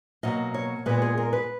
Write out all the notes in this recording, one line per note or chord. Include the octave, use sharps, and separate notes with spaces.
B2 F#3 A#3 D#5
C#5
A#2 G#3 B3 B4
G#4
A#4
B4